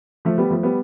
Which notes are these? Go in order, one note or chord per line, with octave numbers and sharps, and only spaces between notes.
F3 A3
G3 B3
F3 A3
G3 B3